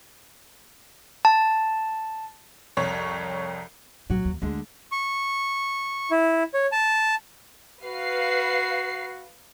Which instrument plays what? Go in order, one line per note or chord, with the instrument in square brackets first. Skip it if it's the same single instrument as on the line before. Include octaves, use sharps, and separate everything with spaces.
[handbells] A5
[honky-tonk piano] C2 F2 C#5
[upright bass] A#1 A2 [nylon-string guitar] F#3 F#4
[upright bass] D#2
[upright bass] D2 [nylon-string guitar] D3 G#3
[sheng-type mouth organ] C#6
E4
C#5
A5
[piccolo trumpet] F#4 [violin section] B4 F5 C7